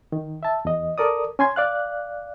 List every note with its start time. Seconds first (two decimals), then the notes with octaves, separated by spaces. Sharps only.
0.12 D#3
0.43 E5 A5
0.65 E2 D#5
0.98 A4 A#4 D5 D#6
1.39 C#4 G#5 C6 G#6
1.56 D5 F5 F#6